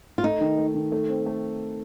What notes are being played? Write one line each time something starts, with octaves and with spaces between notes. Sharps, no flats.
F4
A3 D#4
D#3
A3
D#3
A3
C4
A3